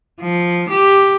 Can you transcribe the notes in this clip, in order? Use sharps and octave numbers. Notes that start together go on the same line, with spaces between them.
F3
G4